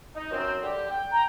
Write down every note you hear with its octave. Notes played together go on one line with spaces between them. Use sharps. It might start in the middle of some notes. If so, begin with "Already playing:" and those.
D#4
F#2 C4
D3 G4
G5
A#5